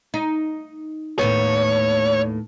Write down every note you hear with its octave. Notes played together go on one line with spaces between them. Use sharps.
D#4
D#2 A2 B3 C#5